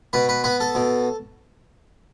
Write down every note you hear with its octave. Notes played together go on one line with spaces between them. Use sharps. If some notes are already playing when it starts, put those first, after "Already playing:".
B2 B4
B4
B3 B4
A4
B2